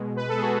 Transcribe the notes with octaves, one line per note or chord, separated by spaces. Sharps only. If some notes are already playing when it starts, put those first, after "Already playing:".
Already playing: B2 G#3
B4
A4
G#4
B2 G#3 F#4